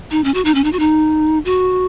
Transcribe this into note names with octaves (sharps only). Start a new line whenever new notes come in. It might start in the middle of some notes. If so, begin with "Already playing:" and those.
D#4
C#4
F#4
D#4
C#4
D#4
F#4
D#4
F#4